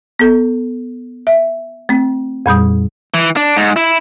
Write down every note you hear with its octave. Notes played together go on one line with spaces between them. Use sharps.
B3 A4
E5
A3 C4
F2 A#2 G3 D#6
E3
D4
G#2
E4